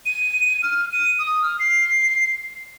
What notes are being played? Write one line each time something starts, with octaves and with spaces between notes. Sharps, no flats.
D#7
F6
D#7
D#6
F6
C7